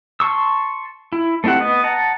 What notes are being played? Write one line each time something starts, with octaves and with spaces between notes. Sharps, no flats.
A5 C6 C#6 E6
E4
A3 C4 E4 G4 F#5
B3 D#5
F#5 A5 A#5